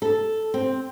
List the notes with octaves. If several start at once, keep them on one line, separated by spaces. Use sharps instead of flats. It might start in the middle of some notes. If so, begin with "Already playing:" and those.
A4
C4